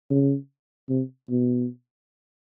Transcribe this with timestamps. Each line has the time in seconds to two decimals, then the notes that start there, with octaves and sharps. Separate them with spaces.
0.10 C#3
0.89 C3
1.30 B2